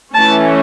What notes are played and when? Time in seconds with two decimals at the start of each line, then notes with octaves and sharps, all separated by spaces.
0.14 E3 A3 C#4 A5